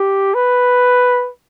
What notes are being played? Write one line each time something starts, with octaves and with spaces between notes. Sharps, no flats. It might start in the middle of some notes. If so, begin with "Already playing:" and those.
Already playing: G4
B4